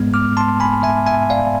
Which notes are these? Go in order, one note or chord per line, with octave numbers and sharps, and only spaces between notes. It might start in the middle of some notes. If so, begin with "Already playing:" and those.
Already playing: G#2 G#3 B3
D6 F6
A5 C6
G#5 B5
E5 G#5
E5 G#5
D5 F5